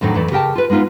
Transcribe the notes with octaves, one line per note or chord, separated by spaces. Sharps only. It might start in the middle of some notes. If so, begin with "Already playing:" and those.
F2 A2 D#3 F#3 D4
F2 E3 A3 D5
C#3 G4 A#4 G5 A5
F4 B4
G#3 B3 D#4 F4 B4